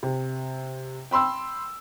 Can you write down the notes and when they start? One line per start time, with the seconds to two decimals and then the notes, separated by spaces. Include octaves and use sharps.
0.03 C3
1.11 G5 B5 C6 E6